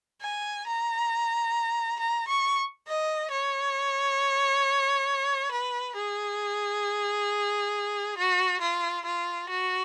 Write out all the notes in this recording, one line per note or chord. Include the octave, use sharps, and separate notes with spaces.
G#5
A#5
A#5
C#6
D#5
C#5
B4
G#4
F#4
F4
F4
F#4